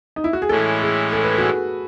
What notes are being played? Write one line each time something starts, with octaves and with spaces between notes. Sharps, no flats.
D#4
E4
F#4
G#4
A2 E3 G#3 C#4 E4 A4
G#4
A4
B4
F#4 A4
G#4